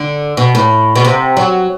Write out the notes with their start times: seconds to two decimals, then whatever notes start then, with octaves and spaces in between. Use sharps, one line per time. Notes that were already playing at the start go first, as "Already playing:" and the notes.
Already playing: D3
0.37 B2
0.55 A2
0.95 B2
1.05 C3
1.37 F#3